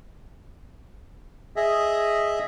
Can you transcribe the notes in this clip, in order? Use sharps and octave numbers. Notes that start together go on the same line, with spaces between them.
G#4 D#5 E5